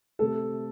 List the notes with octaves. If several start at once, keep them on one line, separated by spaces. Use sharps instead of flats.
C3 A3 A4